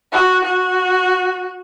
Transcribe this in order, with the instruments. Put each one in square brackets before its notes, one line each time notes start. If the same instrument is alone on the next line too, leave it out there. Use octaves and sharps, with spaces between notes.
[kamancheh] F#4
F#4